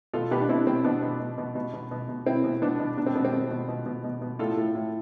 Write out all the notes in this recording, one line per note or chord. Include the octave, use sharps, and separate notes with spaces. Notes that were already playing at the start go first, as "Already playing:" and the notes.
B2 F4 A4
B2 G4 B4
D4
B2 C4 E4
B2 C4
B2 B3 D4
B2
B2
B2
B2
B2
B2
B2
B2 C4 E4
B2
B2 B3 D4
B2
B2 D4
C4
B2 B3
C4
B2
B2
B2
B2
B2
B2
A2 F4 A4
A2
A2